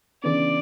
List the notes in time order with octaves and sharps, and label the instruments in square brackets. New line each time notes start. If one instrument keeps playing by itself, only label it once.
[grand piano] C#3 E3 B3 D4 [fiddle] D5